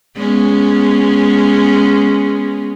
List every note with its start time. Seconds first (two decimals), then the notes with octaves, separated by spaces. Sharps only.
0.17 G#3 B3 C#4